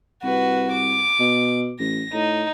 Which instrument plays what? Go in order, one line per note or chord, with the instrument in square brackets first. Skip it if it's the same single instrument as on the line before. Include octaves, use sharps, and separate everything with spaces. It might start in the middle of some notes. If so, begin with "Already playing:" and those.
[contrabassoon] C2 [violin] F#4 B4
[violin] D6
[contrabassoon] B2
[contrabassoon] A1 [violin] A#6
[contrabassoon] A2 [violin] D#4